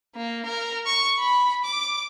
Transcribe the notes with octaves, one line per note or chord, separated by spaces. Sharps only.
A#3
A#4
C#6
B5
D6